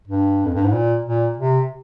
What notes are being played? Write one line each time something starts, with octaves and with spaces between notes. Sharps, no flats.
G2
F2
G2
G#2
A#2
A#2
C3